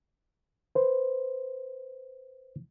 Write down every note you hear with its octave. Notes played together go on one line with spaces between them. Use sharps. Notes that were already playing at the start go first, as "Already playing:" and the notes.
B4 C5